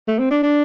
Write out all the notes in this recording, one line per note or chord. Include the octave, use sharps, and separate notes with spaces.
A3
C4
D4
D4